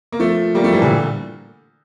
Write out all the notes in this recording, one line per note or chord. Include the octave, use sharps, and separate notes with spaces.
A#3
F3 A3
G3 A#3
F3 A3
E3 G3
A#2 D3